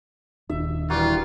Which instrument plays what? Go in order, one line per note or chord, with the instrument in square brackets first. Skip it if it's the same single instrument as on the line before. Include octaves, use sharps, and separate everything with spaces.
[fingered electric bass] D#1 D#2 D4 [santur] E5
[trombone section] E3 G3 [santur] A#3 F#4 [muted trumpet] F4